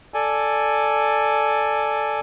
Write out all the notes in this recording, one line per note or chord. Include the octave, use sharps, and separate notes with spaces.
A4 D5 G#5